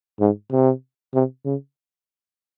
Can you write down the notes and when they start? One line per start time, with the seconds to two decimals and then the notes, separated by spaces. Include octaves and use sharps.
0.20 G#2
0.51 C3
1.14 C3
1.45 C#3